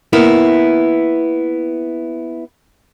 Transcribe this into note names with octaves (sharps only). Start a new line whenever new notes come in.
A#3 B3 E4